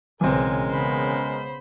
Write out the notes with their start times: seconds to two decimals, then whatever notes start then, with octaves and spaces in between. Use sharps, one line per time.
0.21 B1 C#3 E3 G#3 C4 C#4 A#4 G#5
0.70 C#3 B3 C5 B5